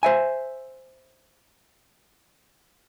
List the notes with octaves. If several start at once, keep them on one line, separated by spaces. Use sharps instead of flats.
C5 E5 G#5